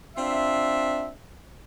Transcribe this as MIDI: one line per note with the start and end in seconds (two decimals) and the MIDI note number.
0.17 1.10 60
0.17 1.10 62
0.17 1.10 65
0.17 1.10 76